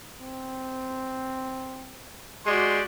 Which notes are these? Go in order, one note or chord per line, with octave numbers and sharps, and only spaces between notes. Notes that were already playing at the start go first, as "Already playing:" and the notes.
C4
G#3 F#4 G4 D5 C6